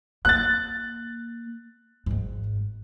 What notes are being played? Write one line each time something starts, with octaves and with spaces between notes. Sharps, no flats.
A#3 F#6 A6
G#1 G#2